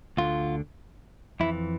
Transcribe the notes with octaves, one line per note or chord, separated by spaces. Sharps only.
D2 D3 F4
F2 E3 E4